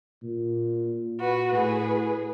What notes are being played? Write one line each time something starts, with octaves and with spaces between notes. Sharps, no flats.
A#2
F#4 B4
A2 G#4 B4